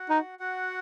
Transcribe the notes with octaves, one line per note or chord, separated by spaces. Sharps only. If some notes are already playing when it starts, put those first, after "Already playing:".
Already playing: F#4 F#5
D#4
F#4 F#5